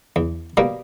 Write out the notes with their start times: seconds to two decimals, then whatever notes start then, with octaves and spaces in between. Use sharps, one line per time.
0.16 E2
0.57 B2 G3 A#3